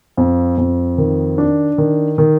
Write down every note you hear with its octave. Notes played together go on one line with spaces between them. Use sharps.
F2
F2
D#3
D4
D#3
D#3